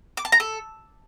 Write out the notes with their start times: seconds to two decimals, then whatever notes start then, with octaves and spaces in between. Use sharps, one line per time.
0.17 D6
0.25 A5
0.32 A#5
0.40 A4